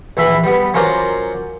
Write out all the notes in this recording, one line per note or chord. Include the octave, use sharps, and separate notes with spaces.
A#1 E3 E4 B5
G3 B3
F#3 C#4 F4 A#4 C5 D5